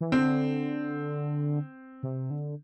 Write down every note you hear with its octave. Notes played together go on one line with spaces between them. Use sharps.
E3
D3 C4
C3
D3